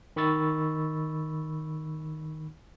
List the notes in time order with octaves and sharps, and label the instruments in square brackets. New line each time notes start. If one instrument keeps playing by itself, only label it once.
[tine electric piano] D#3 B5 C#6 E6 A6